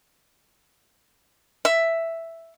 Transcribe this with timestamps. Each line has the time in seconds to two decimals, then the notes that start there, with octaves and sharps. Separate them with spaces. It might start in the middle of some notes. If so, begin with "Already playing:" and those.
1.65 E5